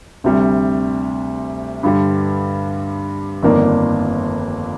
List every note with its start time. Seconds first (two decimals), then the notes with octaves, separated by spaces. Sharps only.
0.24 D2 C3 G3
1.83 G2 D3 G3
3.43 G1 F2 D#3 A#3 D4